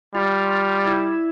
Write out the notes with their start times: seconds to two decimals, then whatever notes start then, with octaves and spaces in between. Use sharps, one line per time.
0.15 G3 F4
0.86 E4